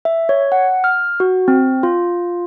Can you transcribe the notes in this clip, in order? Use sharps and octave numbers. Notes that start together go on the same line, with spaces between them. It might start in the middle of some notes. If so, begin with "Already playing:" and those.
E5
C#5
F#5
F6
F#4
C4
F4